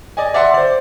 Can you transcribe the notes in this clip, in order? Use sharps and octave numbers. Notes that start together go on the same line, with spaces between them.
D5 D#5 G#5
D5 E5 F#5 C6
C5 D5